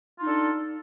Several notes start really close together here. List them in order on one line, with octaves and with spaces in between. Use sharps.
F4 D#4 A4 D4